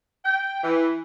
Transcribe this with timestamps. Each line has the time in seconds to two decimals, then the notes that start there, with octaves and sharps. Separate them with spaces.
0.25 G5
0.64 E3